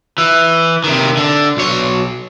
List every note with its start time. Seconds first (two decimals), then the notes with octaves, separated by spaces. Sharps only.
0.18 E3
0.84 C3 D#3
1.17 D3
1.57 B1 C#5